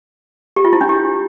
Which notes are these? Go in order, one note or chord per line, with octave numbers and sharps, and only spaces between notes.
G4
F4
E4
D4
G4